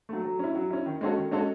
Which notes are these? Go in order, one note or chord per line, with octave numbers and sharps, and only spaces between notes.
F#3 A3
F#3
C#4 E4
F#3
C#4 E4
D#3
G#3 C#4 F#4 A4
D#3
G#3 C#4 F#4 A4